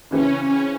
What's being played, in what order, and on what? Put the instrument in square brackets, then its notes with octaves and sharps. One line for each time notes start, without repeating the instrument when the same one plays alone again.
[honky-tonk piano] C#3 E3 C4 E4 [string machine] C#4
[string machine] C#4